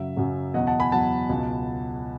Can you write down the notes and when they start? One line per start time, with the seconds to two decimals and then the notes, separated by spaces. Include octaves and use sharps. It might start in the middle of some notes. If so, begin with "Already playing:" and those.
Already playing: F#2 C#3 F#3 E5
0.16 F#2 C#3 F#3
0.54 E2 B2 F#3 D#5 F#5
0.67 F#5 A5
0.79 G#5 B5
0.92 E2 B2 F#3 F#5 A5
1.29 C#2 B2 F#3